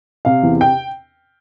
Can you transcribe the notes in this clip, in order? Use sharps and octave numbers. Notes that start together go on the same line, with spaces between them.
C3 F5
E2
G5